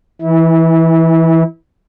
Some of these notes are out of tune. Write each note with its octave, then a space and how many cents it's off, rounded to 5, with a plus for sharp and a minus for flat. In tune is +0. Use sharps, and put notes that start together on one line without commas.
E3 +0 E4 -25